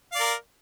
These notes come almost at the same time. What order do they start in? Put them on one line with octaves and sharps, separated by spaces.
F5 D5 A#4